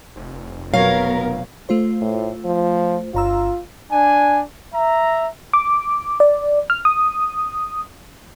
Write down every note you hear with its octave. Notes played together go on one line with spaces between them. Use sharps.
F1
B2 F#3 B3 A#4 C#5 F5
A3 F4 C5
A2
F3
G1 F4 A#5 E6
D4 G#5
E5 A#5
D6
D5
F6
D#6